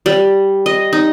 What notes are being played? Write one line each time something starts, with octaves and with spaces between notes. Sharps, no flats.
G3
D#5
D#4